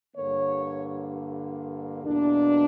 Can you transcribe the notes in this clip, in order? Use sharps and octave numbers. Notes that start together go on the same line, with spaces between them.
G2 D3 A#3 C#5
E2 B2 A#3 D4